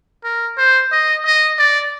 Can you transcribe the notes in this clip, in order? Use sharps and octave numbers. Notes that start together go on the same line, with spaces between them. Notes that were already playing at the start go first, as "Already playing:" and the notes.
A#4
C5
D#5
D#5
D5